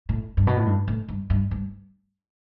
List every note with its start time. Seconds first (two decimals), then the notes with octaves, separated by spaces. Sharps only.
0.09 A2
0.37 G2
0.47 B2
0.57 A2
0.66 G2
0.88 A2
1.08 G2
1.30 G2
1.51 G2